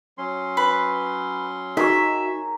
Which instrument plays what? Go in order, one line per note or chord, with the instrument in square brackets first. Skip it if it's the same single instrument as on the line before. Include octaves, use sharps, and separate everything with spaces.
[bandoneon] F#3 C#4 C6
[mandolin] B4
[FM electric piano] D#4 F#4 [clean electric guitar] G#4 A#4 C#5 [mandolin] E5